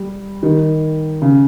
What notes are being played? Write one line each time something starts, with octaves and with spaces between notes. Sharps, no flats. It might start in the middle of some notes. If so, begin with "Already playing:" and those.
Already playing: G3
D#3
C#3